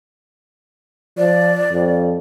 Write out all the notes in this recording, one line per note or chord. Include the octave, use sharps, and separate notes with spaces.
F3 D5
F2